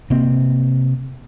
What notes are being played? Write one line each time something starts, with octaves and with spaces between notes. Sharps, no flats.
C3 A#3 C4